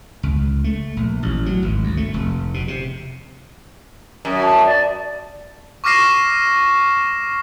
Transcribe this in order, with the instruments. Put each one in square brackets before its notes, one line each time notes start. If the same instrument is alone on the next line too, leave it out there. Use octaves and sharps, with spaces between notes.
[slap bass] C#2
A3
A#1
A1
F#3
G#1
D2
A3
F1
B2
C3
[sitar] F#2
[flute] A5
D5
[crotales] C#6 D6 F6 A#6 C7 E7